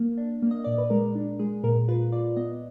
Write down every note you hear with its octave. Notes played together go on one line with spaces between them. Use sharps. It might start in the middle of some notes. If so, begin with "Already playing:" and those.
Already playing: A#3
D4
A#3
D#5
A#2 D5
B4
G#3 A#4
D4
G#3 G#4
A#2 A#4
F4 B4
F4 D5
B3 D#5